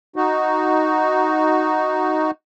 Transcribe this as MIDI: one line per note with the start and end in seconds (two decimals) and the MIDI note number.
0.16 2.31 63
0.16 2.31 66